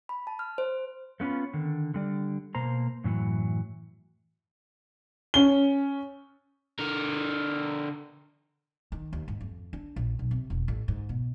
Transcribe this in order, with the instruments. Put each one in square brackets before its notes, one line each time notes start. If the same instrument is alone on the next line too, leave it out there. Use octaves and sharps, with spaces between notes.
[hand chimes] B5
A5
F6
C5
[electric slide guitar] A3 B3 C#4 F4 B4
D3 D#3
D3 G3 D5
B2 A#3 C5 A#5
F#2 A2 E3 F#3
[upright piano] C#4 G7
[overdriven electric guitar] D3 A#4
[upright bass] D#3
D#2
G#2
F2
D4
A#1
B1
C3
E1
A1
G#2
B2